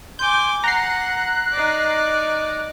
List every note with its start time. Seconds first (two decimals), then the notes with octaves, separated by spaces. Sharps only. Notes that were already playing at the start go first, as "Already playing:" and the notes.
0.19 G#5 C6 D6 G6
0.64 F#5 A#5 F#6 A#6 C7
1.53 D#4 D5